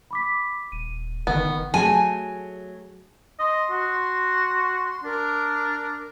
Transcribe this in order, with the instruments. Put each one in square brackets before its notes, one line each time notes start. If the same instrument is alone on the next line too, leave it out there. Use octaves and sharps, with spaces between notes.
[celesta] B5 D6 B6
[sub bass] D#1 [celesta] D#7
[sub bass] F#1 [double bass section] D#3 [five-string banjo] B3
[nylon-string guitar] F#3 A3 G#4 [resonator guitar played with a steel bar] G#5
[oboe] D#5 [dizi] C6
[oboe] F#4
[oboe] D4 [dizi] A#4